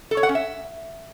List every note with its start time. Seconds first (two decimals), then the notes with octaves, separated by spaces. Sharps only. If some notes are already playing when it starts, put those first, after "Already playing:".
0.11 A4
0.17 C#5
0.23 F#5
0.29 C#4
0.35 E5